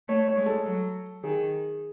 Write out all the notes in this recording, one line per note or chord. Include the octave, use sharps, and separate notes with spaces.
A3 C#5
C#5
G#3
A4
F#3
D#3 G#4